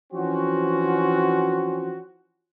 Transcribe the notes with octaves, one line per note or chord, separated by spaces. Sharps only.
E3 F3 C4 C#4 F#4